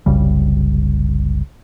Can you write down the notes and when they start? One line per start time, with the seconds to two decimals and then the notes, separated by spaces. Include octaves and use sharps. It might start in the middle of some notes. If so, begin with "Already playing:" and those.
0.06 F#1 C2 C#3 G3